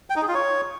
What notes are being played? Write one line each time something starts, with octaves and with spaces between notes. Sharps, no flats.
G5
D#4
G#4
F4
C#5